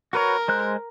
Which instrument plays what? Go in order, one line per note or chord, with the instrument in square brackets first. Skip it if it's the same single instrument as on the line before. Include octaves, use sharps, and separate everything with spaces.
[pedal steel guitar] F#4 B4 C#5 [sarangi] A#4
[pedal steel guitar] G#3 C5 F#6